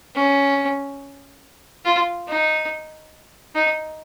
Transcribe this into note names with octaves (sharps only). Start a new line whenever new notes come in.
C#4
F4
D#4
D#4